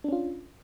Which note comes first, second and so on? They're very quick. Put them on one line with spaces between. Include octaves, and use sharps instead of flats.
D4 C#4 F4